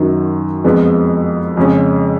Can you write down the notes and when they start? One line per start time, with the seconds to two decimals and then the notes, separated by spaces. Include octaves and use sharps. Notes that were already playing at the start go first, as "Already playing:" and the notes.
Already playing: F#2 D#3 F#3
0.64 F2 F3 G#3 B3
1.57 F2 C#3 G#3 C#4